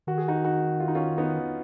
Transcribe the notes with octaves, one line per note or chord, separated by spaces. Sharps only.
D#3 F#4
G#4
D#4 F#4
D#4 F#4
F4
D#4
C#4 F4
B3 D#4